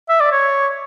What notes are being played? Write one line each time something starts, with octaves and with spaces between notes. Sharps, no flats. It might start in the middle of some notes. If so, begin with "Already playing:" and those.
E5
D5
C#5